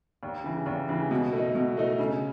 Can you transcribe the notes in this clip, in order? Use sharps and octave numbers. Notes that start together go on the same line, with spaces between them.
D#2
C#3 E3
D#2
C#3 E3
B2
A3 D#4
B2
A3 D#4
C#3